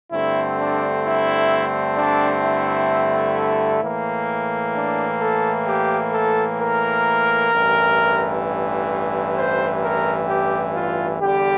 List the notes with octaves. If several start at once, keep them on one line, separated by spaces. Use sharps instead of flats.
G2 D3 A3 C4 E4
D4
E4
D4
E4
A2 E3 A#3
D4
A4
G4
A4
A#4
A1 G2 E3
C5
A#4
G4
F4
E2 D3 G3 G4